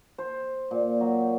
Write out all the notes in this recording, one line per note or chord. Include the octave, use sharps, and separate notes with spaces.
C5
A#2
F#3